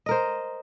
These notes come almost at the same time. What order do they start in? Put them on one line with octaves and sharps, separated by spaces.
D#5 A#4 C5